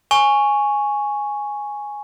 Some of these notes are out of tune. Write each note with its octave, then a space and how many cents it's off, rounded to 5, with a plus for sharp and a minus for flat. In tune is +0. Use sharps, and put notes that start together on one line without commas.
G#5 +0 C#6 +0